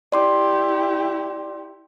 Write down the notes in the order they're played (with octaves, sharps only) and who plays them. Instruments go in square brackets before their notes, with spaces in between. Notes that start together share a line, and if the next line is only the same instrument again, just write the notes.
[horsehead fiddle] E4 G4 [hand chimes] D5 C6 D6